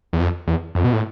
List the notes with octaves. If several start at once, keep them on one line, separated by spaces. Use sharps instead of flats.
E2
F2
E2
F2
B2
A2